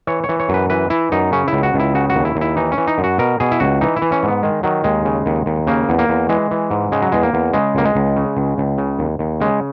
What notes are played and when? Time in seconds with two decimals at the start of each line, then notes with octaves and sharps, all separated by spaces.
0.07 E3 C#5
0.24 C#5
0.29 E3
0.39 C#5
0.49 F#2
0.54 B4
0.70 E3 B4
0.90 E3 E4
1.12 F#2 D#4
1.32 C#3 C#4
1.48 E4
1.53 C#2
1.63 F#4
1.74 C#2
1.79 E4
1.94 C#3 F#4
2.10 F#4
2.15 D#2
2.25 E4
2.36 D#2
2.41 E4
2.56 E3 D#4
2.72 C#4
2.78 E3
2.87 D#4
2.98 F#2
3.04 F#4
3.18 B2 A#4
3.40 B2 G#4
3.51 E4
3.60 C#2 F#4
3.81 E3 D#4
3.96 E4
4.02 E3
4.12 C#4
4.23 G#2
4.28 B3
4.43 D#3 G#3
4.63 D#3 F#3
4.84 D#2 G#3
5.05 C#3
5.26 D#2
5.46 D#2
5.67 C#3 A#3
5.89 E2
5.99 A#3
6.09 E2
6.29 E3 G#3
6.51 E3
6.70 G#2
6.92 C#3 G#3
7.02 F#3
7.12 E2 G#3
7.23 A#3
7.34 E2
7.53 C#3 G#3
7.75 C#2 A#3
7.85 G#3
7.95 C#2
8.17 C#3
8.37 C#2
8.58 C#2
8.78 C#3
8.99 D#2
9.19 D#2
9.40 C#3 G#3